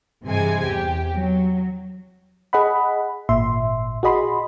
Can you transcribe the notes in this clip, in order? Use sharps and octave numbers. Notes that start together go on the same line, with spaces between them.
G2 C3 E3 G#3 G#5
E2 G4
F#3
G#4 D#5 F#5 B5
G#1 A#2 E5 C6
F#4 G#4 D#5 B5 C6